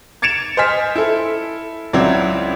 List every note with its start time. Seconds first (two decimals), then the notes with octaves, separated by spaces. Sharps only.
0.22 G#6 A6 C#7 D7 E7 F7
0.57 C5 D#5 G#5 F6 B6
0.96 E4 A4
1.93 C#2 F#3 C4 E4 D5